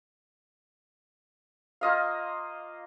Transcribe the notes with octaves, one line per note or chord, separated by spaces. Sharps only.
A#3 F4 D#5 F5